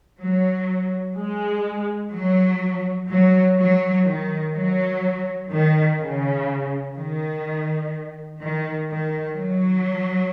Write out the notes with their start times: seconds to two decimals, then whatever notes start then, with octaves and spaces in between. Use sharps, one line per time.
0.20 F#3
1.17 G#3
2.14 F#3
3.10 F#3
3.59 F#3
4.07 D#3
4.55 F#3
5.52 D#3
5.99 C#3
6.96 D#3
8.41 D#3
8.89 D#3
9.38 F#3